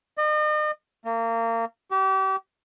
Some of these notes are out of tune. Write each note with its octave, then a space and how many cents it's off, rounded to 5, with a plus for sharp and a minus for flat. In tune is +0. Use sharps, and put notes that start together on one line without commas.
D#5 -40
A#3 -30
G4 -35